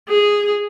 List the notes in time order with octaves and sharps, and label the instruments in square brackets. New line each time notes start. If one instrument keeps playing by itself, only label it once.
[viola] G#4